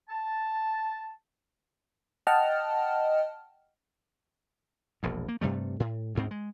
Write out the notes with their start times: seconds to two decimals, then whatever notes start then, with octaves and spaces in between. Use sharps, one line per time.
0.09 A5
2.27 D#5 F#5 G5 A5 F6
5.03 E1 A#1 E2
5.28 A#3
5.41 G2 C3 G3 A3
5.80 A2
6.15 D2 G#2 C4
6.31 G#3